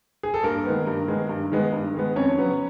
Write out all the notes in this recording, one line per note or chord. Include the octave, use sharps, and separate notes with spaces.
G#4
A4
G2 A#3 A#4
D#3 G#3 B3
G2
D#3 G#3 B3
G2
D#3 G#3 B3
G2
D#3 G#3 B3
F2 C#4 C#5
C#3 F#3 B3